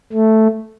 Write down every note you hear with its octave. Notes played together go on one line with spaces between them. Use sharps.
A3